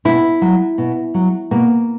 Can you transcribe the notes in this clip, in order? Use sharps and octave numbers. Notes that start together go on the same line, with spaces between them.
B2 E4
F#3
B2
F#3
B2 A#3